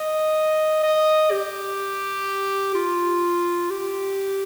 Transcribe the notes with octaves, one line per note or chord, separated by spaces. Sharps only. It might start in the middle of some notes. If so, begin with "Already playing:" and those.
Already playing: D#5
D#5
G4
F4
G4